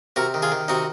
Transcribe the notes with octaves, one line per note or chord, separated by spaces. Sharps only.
C3 F#4 A#4
D#3
F4 G#4
D#3
C3 D#4 F#4